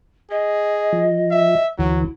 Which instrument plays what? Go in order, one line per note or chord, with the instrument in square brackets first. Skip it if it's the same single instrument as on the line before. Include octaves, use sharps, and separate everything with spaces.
[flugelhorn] G#4 [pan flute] D#5
[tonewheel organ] F3
[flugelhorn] E5
[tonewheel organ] D2 E3 [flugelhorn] F#3 [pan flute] E4